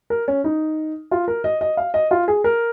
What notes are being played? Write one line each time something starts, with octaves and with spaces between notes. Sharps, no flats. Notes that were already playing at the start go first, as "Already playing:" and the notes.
A#4
C#4
D#4
F4
A#4
D#5
D#5
F5
D#5
F4
G#4
A#4